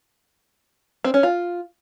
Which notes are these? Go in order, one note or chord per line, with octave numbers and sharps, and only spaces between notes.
C4
C#4
F4